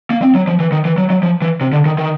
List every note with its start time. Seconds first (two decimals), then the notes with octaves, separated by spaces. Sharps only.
0.10 A#3
0.22 C4
0.35 F#3
0.48 F3
0.60 E3
0.72 D#3
0.85 E3
0.98 F#3
1.10 F#3
1.23 F3
1.42 E3
1.61 C3
1.73 D3
1.86 D#3
1.98 D#3